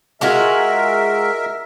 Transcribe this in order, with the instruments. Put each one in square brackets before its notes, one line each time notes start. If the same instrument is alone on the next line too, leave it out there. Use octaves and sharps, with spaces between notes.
[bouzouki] G#3 F4 F#4 [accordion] A#4 E5